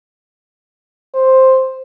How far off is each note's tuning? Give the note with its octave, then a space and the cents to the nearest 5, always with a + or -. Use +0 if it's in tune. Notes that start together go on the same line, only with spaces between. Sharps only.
C5 +5